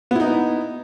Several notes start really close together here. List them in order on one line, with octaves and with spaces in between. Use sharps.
B3 E4 D#4